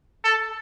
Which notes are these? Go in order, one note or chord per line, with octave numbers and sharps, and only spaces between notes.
A4